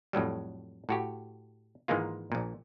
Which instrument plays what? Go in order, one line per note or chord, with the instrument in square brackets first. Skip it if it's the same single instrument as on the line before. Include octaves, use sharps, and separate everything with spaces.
[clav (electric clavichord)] F2 A2 F#3 G3
A2 F#4 G4
G#2 D#3 E3 G#3 A#3 F4
A#1 A#2